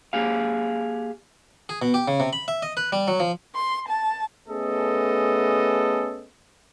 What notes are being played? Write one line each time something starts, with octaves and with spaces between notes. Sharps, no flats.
A#3 G4 G#4 F5
G#4
B2
G4
C#3
C3
B5
E5
D#5
B4
G3
F#3
F3
C6
A5
A3 B3 C#4 G#4 A4 D#5